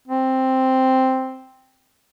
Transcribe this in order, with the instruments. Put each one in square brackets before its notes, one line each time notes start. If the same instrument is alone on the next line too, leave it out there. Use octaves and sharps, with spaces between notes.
[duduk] C4